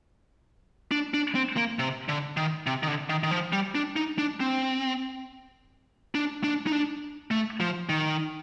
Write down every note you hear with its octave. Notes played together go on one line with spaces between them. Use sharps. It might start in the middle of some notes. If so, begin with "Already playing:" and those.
D4
D4
C4
A#3
C3
D3
D#3
C3
D#3
D3
D#3
D#3
F3
G3
D4
D#4
D4
C4
D4
D4
D#4
D4
A3
F3
D#3